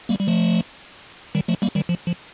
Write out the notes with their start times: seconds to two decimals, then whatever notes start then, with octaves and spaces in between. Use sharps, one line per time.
0.09 G3 A#3
0.20 G3
0.28 F3 A3
1.35 D#3 G3
1.48 F3 A3
1.62 G3 A#3
1.75 D#3 G3
1.89 F3
2.07 F3